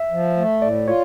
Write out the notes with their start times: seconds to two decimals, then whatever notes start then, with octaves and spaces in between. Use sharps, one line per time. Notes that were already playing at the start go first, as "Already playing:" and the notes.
Already playing: E5
0.11 F3
0.37 A3
0.62 A2 D5
0.87 F4 C#5